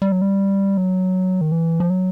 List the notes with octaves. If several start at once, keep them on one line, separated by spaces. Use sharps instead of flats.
G3
F#3
G3
F#3
D#3
E3
F3
F#3